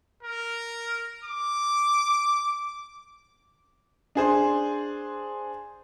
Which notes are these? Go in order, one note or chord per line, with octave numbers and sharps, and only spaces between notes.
A#4
D6
D4 G#4 C5 C6